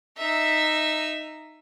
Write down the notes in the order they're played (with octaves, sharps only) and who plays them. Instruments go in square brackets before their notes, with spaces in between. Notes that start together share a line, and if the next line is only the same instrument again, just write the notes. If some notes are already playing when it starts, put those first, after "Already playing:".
[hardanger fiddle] D#4 E5